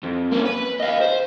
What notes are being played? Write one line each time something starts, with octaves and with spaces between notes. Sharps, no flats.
F2
A#3 C#4
B4
D#5 F5
C5